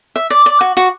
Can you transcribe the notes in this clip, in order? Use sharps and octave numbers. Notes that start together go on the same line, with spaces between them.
E5
D5
D5
F#4
F#4